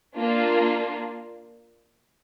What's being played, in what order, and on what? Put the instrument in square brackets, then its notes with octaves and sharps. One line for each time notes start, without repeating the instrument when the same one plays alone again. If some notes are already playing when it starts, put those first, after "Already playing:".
[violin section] A#3 D4 F4